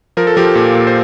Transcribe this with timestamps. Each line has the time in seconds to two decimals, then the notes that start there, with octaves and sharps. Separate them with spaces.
0.17 F3 A#4
0.27 A4
0.37 F3 G4 A#4
0.55 A#2
0.75 A#2
0.87 C5